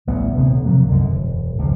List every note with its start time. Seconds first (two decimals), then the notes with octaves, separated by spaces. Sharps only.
0.07 A1 D2 G3 B3
0.36 D#1 D2 C3 B3
0.65 C3 F3 F#3 A#3
0.88 C2 F#2 D3 G#3
1.10 E1
1.58 G#1 C#2 D#3 F3